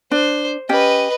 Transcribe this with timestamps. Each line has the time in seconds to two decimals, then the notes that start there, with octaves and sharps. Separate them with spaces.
0.11 D4 C5
0.69 C#4 G4 B4 D#5